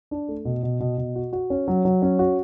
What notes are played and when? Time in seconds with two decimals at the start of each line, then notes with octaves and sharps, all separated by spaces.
0.11 D4
0.28 A3
0.45 B2
0.63 B2
0.80 B2
0.98 B2
1.15 F#4
1.33 F#4
1.50 C#4
1.68 F#3
1.85 F#3
2.02 C#4
2.19 F#4